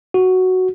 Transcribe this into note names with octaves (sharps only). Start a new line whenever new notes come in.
F#4